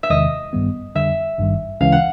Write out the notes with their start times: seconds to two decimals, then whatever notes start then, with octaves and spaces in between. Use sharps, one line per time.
0.03 E5
0.10 E2 C3 D#3 G#3 D#5
0.53 A1 G2 D#3 G3 B3
0.95 F2 D3 G3 E5
1.38 G#1 G2 D#3 G3
1.81 D2 C#3 E3 G#3 C#4 F5
1.92 F#5